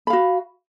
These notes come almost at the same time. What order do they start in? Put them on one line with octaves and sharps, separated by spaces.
B5 F5 F#4